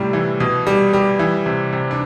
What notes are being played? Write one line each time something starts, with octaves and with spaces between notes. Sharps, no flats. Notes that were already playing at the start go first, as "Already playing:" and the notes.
Already playing: A2 C3 G3
E3
B2
G3
G3
E3
C3
C3
D4